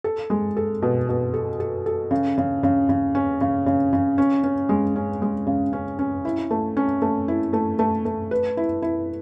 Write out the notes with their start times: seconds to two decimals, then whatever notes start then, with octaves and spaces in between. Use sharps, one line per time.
0.04 A4
0.30 G#3
0.57 A4
0.82 B2
1.09 B2
1.34 A4
1.60 A4
1.86 A4
2.11 C#3
2.38 C#3
2.63 C#3
2.89 C#3
3.15 C#4
3.41 C#3
3.66 C#3
3.93 C#3
4.18 C#4
4.44 C#4
4.69 G#3
4.96 C#4
5.22 G#3
5.47 C#3
5.73 C#4
5.99 C#4
6.25 E4
6.51 A3
6.77 C#4
7.02 A3
7.28 E4
7.53 A3
7.79 A3
8.05 A3
8.31 B4
8.57 E4
8.82 E4